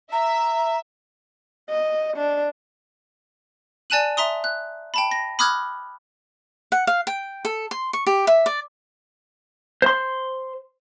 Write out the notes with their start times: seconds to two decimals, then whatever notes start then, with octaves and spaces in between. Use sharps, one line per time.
0.12 E5 A#5
1.70 D#5
2.16 D4
3.90 D5 G#5 A5 F#6 D#7 F#7
4.17 E5 A#5 C6 D#6
4.44 F#6
4.94 G5 A5 B5
5.11 A#6
5.39 B5 D6 D#6 F6 F#6 G#6
6.72 F#5
6.87 F5
7.07 G5
7.45 A4
7.71 C6
7.93 C#6
8.07 G4
8.27 E5
8.46 D5
9.82 C5 C6